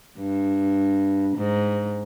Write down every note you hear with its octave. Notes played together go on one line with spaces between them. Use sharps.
G2
G#2